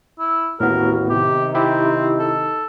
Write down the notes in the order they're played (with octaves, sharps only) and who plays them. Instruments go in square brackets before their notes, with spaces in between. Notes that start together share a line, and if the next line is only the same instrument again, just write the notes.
[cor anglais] E4
[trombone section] A1 D#2 F#4 [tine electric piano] A2 B3 [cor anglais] A#4
[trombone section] C3 D#3 D#4 [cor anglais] G4
[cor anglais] C4 [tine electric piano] E4 G4
[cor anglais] A4